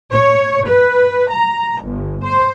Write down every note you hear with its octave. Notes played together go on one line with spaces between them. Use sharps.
C#5
B4
A#5
G1
C5